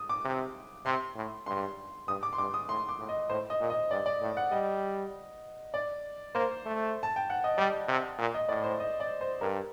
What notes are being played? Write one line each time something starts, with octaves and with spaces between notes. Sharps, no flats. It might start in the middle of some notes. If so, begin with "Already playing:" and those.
Already playing: D#6
D6
C3
C3 C6
A2
G2 C6
G2 D#6
D6
C6
G2 D6
D#6
A2 C6
D6
A2
D#5
A2 C5
D#5
A#2
D#5
G2 D5
D5
A2
F#5
G3 D#5
D5
A#3 C5
A3
A5
G5
F#5
D#5
G3 D5
C3
A#2
D#5
A2 D5
C5
D#5
D5
C5
G2 A#4